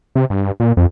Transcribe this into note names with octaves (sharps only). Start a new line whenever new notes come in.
C3
G2
A#2
F2